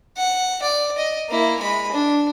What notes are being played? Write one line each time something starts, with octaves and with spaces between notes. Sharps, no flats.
F#5
D5
D#5
A#3 E4
G#3 B5
D4